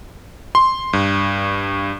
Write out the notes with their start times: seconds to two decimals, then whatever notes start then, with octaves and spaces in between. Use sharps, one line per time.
0.55 C6
0.93 G2